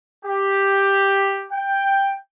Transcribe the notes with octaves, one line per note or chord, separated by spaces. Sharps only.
G4
G5